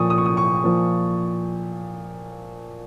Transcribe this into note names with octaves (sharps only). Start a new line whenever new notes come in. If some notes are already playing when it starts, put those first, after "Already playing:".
Already playing: A#2 F3 C#6 D#6
D#6
C#6
D#6
C#6
A#2 F3